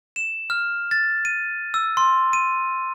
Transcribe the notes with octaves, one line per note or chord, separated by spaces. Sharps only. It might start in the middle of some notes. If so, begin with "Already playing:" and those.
E7
F6
A6
D#7
E6
C6
D#7